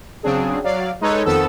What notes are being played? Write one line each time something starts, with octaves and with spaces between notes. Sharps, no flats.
C#3 F#3 C4 D4 G#4
F#3 D5 F5
G#3 D#4 A4 B4 C#5
F2 D#3 F3 B3 A4 E6